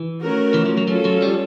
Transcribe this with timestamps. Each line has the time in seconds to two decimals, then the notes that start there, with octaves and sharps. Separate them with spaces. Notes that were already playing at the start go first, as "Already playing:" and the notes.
Already playing: E3
0.20 A3 C#4 F#4 A#4
0.54 E3
0.66 F3
0.77 F#3
0.88 F#3 C#4 F4 A4
1.05 F#3
1.22 G3